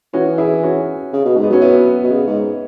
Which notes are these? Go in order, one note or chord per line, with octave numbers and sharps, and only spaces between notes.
E3 C#4 F#4
E4 G#4
C#4 F#4
C#3
B2
G#2
B3
F#3 C#4
B3 E4
B2
C#3
G#2